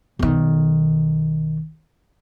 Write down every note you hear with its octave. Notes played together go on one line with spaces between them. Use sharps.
B1 D#3